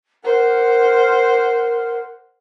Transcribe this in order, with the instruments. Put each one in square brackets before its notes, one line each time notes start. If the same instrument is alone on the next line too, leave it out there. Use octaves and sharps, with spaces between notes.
[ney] A#4 [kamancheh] C5 F#5